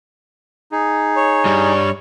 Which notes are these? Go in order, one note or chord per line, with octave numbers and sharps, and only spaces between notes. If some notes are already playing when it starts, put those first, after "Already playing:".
D#4 G#4
C#5
G2 G3